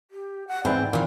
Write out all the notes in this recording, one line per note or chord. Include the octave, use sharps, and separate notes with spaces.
G4
F#5
G#2 E3 C4 D5
A#2 D#3 E3